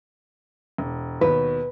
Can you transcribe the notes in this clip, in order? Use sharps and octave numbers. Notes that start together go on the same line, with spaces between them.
E1
D#2 B2 B4